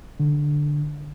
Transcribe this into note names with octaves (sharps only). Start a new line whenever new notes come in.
D3